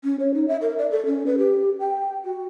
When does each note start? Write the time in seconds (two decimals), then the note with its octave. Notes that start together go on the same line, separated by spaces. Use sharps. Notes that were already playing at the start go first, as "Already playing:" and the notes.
0.04 C#4
0.20 C#5
0.34 D#4
0.48 E5
0.62 A#4
0.78 D5
0.91 A4
1.06 C#4
1.26 B4
1.38 G4
1.80 G5
2.25 F#4